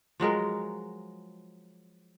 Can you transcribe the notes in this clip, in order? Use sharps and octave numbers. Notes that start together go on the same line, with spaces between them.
F3 F#3 G#3 A#4